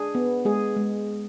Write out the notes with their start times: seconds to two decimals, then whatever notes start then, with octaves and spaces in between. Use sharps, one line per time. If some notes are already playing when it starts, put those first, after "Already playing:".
Already playing: D4 G#4
0.15 B3
0.45 G#3 G#4
0.76 G#3